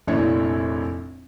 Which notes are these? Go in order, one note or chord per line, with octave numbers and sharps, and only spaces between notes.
F1 A#1 D4 E4 C#5